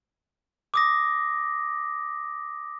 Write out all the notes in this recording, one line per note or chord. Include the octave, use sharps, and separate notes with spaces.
D6 D#6 A#6